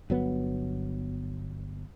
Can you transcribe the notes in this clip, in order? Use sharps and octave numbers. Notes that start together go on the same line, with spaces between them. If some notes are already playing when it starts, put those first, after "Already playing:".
G1 F#3 B3